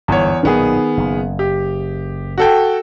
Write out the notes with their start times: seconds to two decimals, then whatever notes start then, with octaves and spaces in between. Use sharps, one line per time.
0.08 G1 E2 G#2 C#5
0.43 B1 A#2 D#3 B3 G#4
0.97 F#1
1.39 G4
2.38 F#4 A4 G5